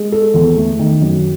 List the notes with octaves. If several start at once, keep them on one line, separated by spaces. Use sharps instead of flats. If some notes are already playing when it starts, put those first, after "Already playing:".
Already playing: G#3
A4
E2
A3
D#3
F#2